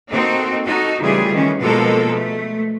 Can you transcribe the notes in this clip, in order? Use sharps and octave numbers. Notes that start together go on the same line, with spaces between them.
A#3 C4 D#4 F#4 A4
D#4 F#4 A4
C#3 E3 G3 A3 F4 G#4
D#3 E3 C#4
B2 F3 G#3 A#3 A4 A#4
A3